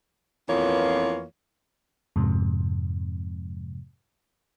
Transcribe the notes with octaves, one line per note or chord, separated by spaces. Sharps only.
F2 E3 A#3 B3 F4 C#5
F2 G#2 C3